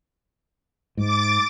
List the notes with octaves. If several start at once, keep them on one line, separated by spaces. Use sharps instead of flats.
G#2 D6 A6